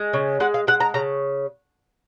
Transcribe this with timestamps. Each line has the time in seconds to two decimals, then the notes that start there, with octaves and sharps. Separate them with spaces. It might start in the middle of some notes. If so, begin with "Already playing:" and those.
Already playing: G#3
0.13 C#3
0.40 G#3 F#5
0.54 F5
0.67 G#3 F#5
0.80 A#5
0.94 C#3 A#5